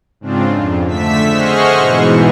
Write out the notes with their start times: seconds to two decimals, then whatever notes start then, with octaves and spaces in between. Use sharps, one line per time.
0.20 G#2 C#3 C4 D4 F4
0.55 F2
0.88 D3 A3 E5 E6 B6
1.28 G#4 C5 D#5 F#5 C#6 F6
1.73 G#2 B2 E3